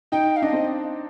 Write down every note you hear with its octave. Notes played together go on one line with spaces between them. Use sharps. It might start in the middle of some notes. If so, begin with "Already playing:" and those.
D#4 G5
F5
D4 D#5
C4